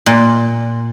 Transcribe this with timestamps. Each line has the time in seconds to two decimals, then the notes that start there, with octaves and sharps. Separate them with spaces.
0.06 A#2